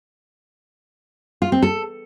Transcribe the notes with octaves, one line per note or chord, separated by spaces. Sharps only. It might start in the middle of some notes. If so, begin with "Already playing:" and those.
F4
C4
A4